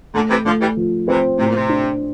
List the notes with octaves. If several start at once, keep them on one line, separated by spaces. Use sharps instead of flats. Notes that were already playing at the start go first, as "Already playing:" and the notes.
A#2 D3 A3
C3 E3
D3 F3 A3
E3 G3
F3
C3 E3 C4
A2 C3
A#2
C3
D4